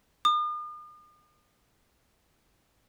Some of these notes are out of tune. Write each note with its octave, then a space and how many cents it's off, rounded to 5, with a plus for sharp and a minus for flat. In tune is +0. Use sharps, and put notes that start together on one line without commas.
D#6 -45